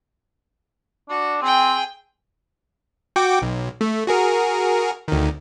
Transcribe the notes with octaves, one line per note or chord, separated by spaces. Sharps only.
D4 F#4
C4 G#4 G5
F#4 G5 D6
B1
A3
F#4 G#4 A#4
D2 D#3